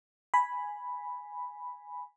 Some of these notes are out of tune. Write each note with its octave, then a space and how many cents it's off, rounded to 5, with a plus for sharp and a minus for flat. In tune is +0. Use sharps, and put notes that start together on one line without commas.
G#5 +0 B5 +0